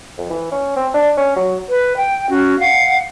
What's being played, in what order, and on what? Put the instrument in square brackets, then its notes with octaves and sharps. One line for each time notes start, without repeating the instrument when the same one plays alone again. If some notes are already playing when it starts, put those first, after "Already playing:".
[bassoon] F2
E3
C#4
C4
D4
C#4
F#3
[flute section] B4
G5
C#4 F#4
F5 F#5